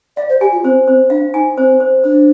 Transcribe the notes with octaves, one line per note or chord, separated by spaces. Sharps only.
D5 F5
C5
G4 G#5
F4
C4 C5
C4 C5
D4 F5
D#4 G#5
C4 C5
C5
D4 C5